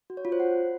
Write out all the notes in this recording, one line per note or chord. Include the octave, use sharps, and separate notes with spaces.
F#4
C#5
F4
C5
F#5